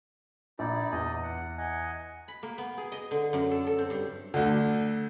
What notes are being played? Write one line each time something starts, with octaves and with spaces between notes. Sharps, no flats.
A#1 D#4 E4 D5
E2 D#5 D#6
F#5
D#5 F#5 G#5
B5
A#3
B3
G#4
D#5
D3
F#2
A4
A4
C4
G2
D2 D3